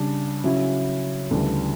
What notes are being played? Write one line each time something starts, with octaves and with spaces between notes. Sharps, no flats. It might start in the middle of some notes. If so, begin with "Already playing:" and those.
Already playing: C#3 G3 D4
C#3 F#3 C#4 E4
D2 C#3 E3 G3 D4